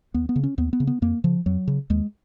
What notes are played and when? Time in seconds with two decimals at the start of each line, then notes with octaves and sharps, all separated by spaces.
0.14 D#2 B3
0.29 B3
0.36 C#3
0.43 C#4
0.58 D#2 B3
0.73 B3
0.80 C#3
0.87 B3
1.02 F2 A#3
1.24 C#3 F3
1.46 F2 F#3
1.67 C#3
1.90 D#2 G#3